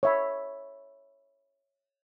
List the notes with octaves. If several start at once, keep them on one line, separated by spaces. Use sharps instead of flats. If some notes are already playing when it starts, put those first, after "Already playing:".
C#5 E5 B5